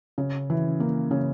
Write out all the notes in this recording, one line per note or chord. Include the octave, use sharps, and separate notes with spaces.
C#3
E3
A#3
C#3